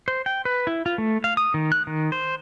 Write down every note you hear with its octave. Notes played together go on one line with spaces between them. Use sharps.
C5
G5
B4
E4
F4
A3
F5
D#6
D#3
F#6
D#3
C5